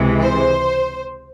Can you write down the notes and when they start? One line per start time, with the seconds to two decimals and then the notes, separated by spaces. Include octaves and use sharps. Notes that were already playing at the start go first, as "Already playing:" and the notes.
Already playing: C#2 C3 E3 G#3
0.22 C5